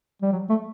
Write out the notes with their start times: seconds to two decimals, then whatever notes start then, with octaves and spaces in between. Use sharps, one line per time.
0.22 G3
0.32 F#3
0.49 A3